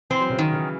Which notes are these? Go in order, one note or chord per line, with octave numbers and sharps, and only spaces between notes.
E3 C4
F#3
C#3 E3
D#3
C#3 E3